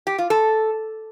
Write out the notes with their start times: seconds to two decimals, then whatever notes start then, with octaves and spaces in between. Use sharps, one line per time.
0.07 G4
0.18 F4
0.30 A4